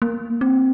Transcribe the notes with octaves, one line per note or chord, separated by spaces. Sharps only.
A#3
C4